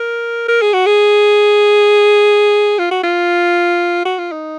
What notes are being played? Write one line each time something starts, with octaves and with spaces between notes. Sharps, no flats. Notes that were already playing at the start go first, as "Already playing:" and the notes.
Already playing: A#4
A#4
G#4
F#4
G#4
F4
F#4
F4
F#4
F4
D#4